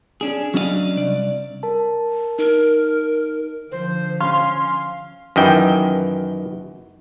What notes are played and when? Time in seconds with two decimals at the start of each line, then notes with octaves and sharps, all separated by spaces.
0.21 C#4 D4 G#4
0.54 F#3 C#4 D4 E4 D#5 F5
0.96 C2 D5
1.63 A#4 A5
2.39 D#4 A#4
3.72 D3 F3 C5
4.20 C#4 F5 C6
5.36 F#2 D#3 E3 G5